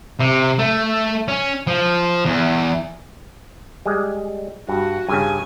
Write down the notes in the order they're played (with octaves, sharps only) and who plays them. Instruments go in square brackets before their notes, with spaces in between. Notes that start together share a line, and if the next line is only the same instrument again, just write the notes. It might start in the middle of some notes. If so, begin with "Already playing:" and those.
[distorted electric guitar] C3
A3
C#4
F3
E2
[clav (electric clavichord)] G3 G#3
[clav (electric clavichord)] G2 [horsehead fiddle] F#4
[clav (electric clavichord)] G2 C#3 [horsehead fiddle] G#5